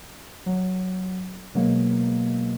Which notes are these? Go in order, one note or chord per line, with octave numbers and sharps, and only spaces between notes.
F#3
B2 F#3 G#3 A#3